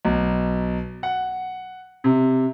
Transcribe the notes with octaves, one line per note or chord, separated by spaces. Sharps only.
B1
F#5
C3